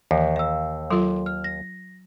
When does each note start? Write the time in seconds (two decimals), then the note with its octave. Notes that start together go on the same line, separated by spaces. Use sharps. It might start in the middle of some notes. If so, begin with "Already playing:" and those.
0.11 D#2 E3
0.36 F5 E6
0.91 F#3 F4 A4 C6
1.26 F6
1.44 A#6